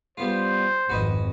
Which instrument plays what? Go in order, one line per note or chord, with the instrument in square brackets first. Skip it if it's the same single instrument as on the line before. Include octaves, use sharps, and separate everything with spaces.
[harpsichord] G3 B3 F4 [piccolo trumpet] C5
[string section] G#1 F2 [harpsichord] F#4 B4 D#5